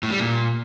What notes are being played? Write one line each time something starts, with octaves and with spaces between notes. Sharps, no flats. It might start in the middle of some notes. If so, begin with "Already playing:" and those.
A2
G3
A#2